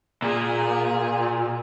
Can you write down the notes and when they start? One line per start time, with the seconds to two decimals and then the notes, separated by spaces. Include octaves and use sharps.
0.22 A#2 G#4